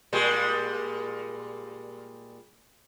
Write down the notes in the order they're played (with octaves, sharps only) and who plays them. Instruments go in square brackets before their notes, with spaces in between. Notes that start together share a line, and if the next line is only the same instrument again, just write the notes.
[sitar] A#2 G3 G#3